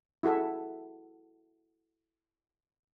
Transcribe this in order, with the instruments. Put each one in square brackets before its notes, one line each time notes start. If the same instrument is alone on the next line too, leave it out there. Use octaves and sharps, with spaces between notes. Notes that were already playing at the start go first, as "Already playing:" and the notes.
[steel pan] E4 F#4 G#4 A4 E5